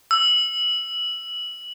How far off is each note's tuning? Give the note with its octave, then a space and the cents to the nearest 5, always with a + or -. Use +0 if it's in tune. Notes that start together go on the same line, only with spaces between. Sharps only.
E6 +15